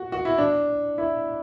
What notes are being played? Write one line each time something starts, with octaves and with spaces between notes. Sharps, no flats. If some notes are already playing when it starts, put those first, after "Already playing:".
Already playing: F#4
F#4
E4
D4
E4